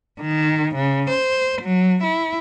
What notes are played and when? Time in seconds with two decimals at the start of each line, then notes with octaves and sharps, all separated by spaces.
0.21 D#3
0.75 C#3
1.10 C5
1.61 F#3
2.03 E4